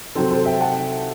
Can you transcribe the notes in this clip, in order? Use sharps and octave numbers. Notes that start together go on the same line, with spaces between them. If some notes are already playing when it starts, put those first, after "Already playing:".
C3 F#3 C4 A4 C5
A4 C5
E5 G5
F#5 A5